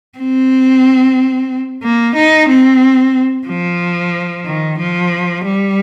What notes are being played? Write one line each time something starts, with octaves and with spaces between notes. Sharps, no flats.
C4
A#3
D#4
C4
F3
D#3
F3
G3